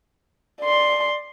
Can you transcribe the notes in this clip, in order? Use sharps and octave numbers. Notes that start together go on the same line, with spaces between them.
D5 C6